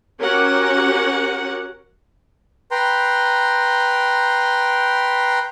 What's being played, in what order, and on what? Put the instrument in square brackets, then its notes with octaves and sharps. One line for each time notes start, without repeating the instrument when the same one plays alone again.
[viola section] C#4 F#4 G4 A#4 F#5
[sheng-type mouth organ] B4 G5 A#5 C6